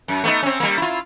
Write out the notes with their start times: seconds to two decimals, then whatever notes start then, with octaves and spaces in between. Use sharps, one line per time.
0.08 F#2
0.24 A3 B3 D#4
0.43 C4 C#4
0.60 G3 A#3
0.78 E4 F4